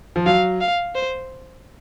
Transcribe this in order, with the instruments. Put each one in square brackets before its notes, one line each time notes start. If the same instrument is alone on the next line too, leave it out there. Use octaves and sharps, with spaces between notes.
[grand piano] F3
[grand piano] F#3 [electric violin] F5
[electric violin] F5
C5